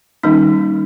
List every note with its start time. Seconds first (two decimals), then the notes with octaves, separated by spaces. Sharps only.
0.23 D#3 G3 A#3 C#4 D#4